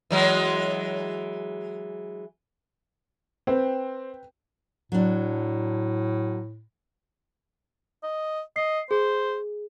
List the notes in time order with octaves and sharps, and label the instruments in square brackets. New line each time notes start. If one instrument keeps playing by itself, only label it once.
[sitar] E3 F#3 G#3
[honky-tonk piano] C4 [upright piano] B4 G5
[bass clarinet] A2 [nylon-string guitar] F#3 D4
[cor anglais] D#5
[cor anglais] D#5 [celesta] C7
[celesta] G#4 [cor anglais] C5